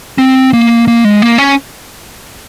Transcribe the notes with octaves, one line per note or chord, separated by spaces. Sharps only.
C4
A#3
A#3
G#3
A#3
C#4